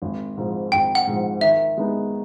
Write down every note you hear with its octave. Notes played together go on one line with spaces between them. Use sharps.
G#1
G#2 F3
G#1 G5
F#5
G#2 F3
D#3 E5
G#3 B3 D#4